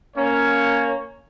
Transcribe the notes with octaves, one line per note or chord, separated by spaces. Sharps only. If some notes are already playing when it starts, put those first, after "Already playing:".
A#3 C#4 C#5